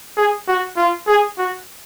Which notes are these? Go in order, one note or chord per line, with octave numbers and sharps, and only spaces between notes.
G#4
F#4
F4
G#4
F#4